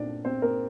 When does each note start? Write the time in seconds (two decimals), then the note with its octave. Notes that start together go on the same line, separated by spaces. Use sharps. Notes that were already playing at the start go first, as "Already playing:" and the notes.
Already playing: A#2 A3 C4 D4 D5
0.25 C4 C5
0.42 A#3 A#4